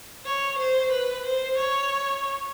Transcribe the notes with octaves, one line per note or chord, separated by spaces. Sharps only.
C#5
C5
B4
C5
C#5